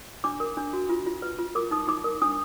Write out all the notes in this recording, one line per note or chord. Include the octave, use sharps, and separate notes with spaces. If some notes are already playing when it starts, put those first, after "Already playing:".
D4 D6
A#4
D4
F#4
F4
F4
B4
F4
A#4 D6
D#4 D#6
D#4 D6
A#4
D4 D#6